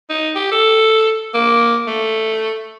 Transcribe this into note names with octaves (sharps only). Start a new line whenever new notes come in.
D#4
G4
A4
A#3
A3